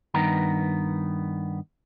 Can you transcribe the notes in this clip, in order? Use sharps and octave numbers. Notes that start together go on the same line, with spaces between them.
G2 D#3 B3 A#5